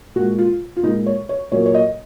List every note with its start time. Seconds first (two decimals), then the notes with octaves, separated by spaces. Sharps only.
0.16 A#2 F#4
0.20 G#3
0.39 F4
0.77 F4
0.83 A#2 G#3 D#4
1.06 C#5
1.29 C#5
1.52 A#2 F#3 A#3 C#5
1.66 C#5
1.74 D#5